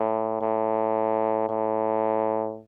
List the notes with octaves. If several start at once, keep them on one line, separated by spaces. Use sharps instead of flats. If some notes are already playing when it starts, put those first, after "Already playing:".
Already playing: A2
A2
A2